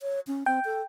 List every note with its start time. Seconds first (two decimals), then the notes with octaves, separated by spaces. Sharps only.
0.01 C#5
0.27 C#4
0.46 C4 G5
0.65 A4